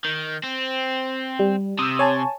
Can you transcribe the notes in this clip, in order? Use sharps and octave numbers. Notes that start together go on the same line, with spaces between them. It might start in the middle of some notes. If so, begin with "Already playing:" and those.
D#3
C4
G3
C3 D#6 E6
C#5 G#5 A5